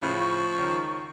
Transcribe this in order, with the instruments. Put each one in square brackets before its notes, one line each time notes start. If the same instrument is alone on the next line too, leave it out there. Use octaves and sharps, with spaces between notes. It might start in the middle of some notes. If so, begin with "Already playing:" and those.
[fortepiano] A2 C#3 [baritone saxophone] F3 [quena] B5
[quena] C#6
[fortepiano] C#2 D#3